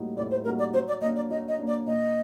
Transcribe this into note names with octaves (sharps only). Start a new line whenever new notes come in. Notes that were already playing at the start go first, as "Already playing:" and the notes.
Already playing: A2 G3 A#3 D#4 F#4
A2 D5
C5
G3 A#3 D#4 F#4 A#4
D5
F#3 C5
D5
A#3 D4 D#5
D5
F#3 D#5
D#5
A#3 D4
D5
A#2 D#5